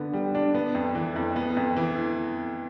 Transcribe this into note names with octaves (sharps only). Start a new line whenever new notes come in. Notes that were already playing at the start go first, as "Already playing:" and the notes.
Already playing: D3 B3
G3
D4
B3
F2
E3
F2
B3
F2
E3